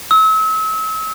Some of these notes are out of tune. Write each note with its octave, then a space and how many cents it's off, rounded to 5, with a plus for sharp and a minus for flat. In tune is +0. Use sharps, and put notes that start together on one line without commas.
E6 -35